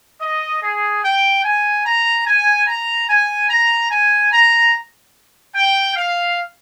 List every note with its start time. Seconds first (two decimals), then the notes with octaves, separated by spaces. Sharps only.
0.21 D#5
0.62 G#4
1.03 G5
1.44 G#5
1.85 A#5
2.26 G#5
2.67 A#5
3.08 G#5
3.49 A#5
3.90 G#5
4.32 A#5
5.55 G5
5.96 F5